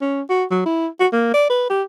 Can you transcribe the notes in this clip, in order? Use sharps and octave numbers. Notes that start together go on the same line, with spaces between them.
C#4
F#4
F#3
E4
F#4
A#3
D5
B4
G4